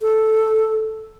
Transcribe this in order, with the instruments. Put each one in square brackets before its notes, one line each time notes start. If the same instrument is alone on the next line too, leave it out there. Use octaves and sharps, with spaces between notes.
[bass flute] A4